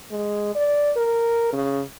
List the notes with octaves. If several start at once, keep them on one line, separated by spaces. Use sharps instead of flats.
G#3
D5
A#4
C#3